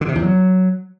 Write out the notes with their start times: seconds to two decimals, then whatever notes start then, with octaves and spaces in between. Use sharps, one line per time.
0.01 D3
0.08 C3
0.15 E2
0.22 F#3